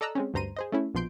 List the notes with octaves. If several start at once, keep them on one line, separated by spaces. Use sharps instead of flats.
A4 D5 D#5 A#5 E6 F#6
G#3 C4 C#4
D2 G2 C5 A#5 C6 D#7
G#4 C5 D#5
A3 C#4 E4
A#1 B2 F3 C6 G6 D7